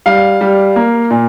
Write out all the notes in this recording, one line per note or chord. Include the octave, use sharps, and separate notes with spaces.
G3 F5
G3
A#3
A#2